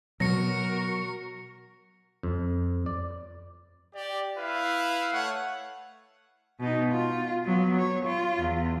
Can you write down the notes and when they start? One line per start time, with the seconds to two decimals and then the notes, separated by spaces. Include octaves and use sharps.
0.20 B2 F#3 F#4 A#4 C#6 A#6 C#7
2.23 F2
2.86 D5
3.95 G4 D5
4.38 E4 B4 F5
5.13 A3 C#5 F#5
6.60 B2 D#4
6.92 F4
7.46 F#3 B3
7.77 C#5
8.06 F4
8.39 E2